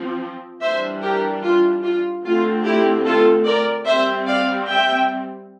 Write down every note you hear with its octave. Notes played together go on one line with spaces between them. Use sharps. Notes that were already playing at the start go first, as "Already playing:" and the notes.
Already playing: F3 C4
E3 G3 D4 C5 E5
G4 A#4
F4
F4
D3 A3 C4 F4
E4 G4
F4 A4
A#4 D5
G3 C4 C5 E5
D5 F5
E5 G5